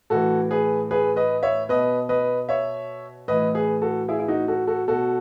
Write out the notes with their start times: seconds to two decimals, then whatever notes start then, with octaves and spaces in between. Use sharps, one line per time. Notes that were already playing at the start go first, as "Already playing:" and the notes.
0.10 A2 E3 F#4 A4
0.51 G#4 B4
0.91 G#4 B4
1.16 B4 D#5
1.43 C#5 E5
1.69 B2 B4 D#5
2.09 B4 D#5
2.49 C#5 E5
3.28 A2 E3 B4 D#5
3.55 G#4 B4
3.82 F#4 A4
4.08 E4 G#4
4.19 E4
4.28 D#4 F#4
4.48 F#4 A4
4.67 F#4 A4
4.88 B2 F#4 A4